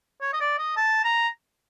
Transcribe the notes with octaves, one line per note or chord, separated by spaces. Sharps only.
C#5
D#5
D5
D#5
A5
A#5